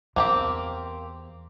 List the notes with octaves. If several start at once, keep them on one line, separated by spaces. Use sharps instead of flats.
E2 A#3 C4 G4